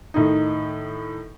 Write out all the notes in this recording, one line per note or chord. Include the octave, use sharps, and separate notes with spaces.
A2 D#3 D#4